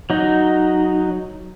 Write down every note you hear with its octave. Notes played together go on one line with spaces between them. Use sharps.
F#3 D#4